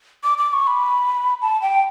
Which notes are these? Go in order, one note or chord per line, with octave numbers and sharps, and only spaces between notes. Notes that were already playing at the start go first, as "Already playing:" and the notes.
D6
D6
C#6
B5
A5
G5